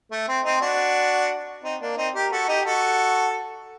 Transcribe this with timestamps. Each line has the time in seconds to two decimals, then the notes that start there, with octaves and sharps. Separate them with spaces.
0.11 A3
0.28 C4
0.44 C4 D#4
0.61 D4 F#4
1.63 C4 D#4
1.81 A#3 D4
1.97 C4 D#4
2.15 G4 A#4
2.32 F#4 A4
2.48 D#4 G4
2.65 F#4 A4